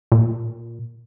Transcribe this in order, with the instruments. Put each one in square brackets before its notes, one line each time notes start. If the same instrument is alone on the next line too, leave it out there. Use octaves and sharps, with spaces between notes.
[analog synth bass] A#2